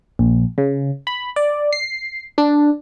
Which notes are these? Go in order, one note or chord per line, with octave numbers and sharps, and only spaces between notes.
A#1
C#3
B5
D5
C7
D4